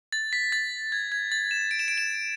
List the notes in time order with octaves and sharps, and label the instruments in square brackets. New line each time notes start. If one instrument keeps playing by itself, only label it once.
[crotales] A6
B6
A6
G#6
G#6
A6
E7
D7
E7
D7
E7